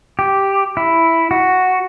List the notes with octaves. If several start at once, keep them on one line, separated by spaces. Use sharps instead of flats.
G4
E4
F#4